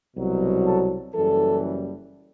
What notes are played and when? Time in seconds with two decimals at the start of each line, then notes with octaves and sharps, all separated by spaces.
0.15 C2 B2 F#3
0.64 A4
1.14 F#1 F#2 E3 G3 A4